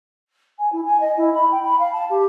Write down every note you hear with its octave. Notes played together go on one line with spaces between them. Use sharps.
G#5
E4
G#5
D#5
E4
B5
G5
B5
F5
A5
G4